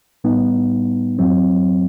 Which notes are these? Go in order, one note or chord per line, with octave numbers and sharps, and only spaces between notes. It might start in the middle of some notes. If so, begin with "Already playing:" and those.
A2 G3 B3 D#4
F#2 F#3 C4